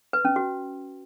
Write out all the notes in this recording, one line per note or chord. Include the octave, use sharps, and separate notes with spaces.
B4
C#4
F#4